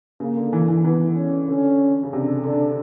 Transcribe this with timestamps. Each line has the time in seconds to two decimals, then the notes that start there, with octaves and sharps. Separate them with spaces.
0.20 C#3 A#3
0.37 D3
0.53 E3
0.68 E3
0.84 E3 B3
1.16 C#4
1.48 D3 C#4
2.03 C#3
2.13 C3 D4
2.44 D3 D4